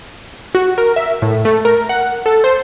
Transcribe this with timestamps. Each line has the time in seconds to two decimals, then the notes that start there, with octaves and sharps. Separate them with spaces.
0.55 F#4
0.78 A#4
0.96 E5
1.22 A2
1.45 A3
1.65 A#4
1.89 F#5
2.26 A4
2.44 C5